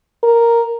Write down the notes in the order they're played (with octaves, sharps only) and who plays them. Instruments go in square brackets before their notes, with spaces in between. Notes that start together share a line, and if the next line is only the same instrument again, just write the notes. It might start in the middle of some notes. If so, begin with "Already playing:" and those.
[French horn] A#4